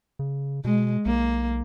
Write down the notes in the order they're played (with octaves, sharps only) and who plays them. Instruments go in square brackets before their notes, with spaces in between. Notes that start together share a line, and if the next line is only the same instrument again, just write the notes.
[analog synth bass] C#3
[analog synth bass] B2 [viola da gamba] G#3
[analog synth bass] B1 [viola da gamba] A#3